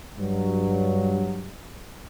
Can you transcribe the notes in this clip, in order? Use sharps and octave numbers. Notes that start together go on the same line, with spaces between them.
G2 F#3